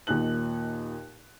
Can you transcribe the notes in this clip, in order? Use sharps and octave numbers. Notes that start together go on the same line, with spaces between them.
D#2 A#2 D#4 F#6 F#7